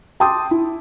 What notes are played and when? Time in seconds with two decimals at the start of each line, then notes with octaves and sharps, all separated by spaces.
0.20 G5 A5 C6 D6 D#6
0.51 E4